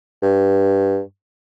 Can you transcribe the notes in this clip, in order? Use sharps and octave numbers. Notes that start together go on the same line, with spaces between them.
G2